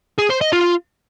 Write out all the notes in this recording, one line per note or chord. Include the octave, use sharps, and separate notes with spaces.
G#4
C5
D#5
F4